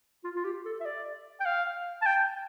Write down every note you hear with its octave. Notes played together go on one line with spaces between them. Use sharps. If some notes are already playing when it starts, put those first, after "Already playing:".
F4
F4
G4
A4
E5
D5
G5
F5
A5
G5